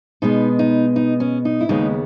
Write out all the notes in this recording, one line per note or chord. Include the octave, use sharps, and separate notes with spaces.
B2 G#3 B3 D#4
D#4
D#4
C#4
D#4
E4
D#2 C#3 G#3 B3 D#4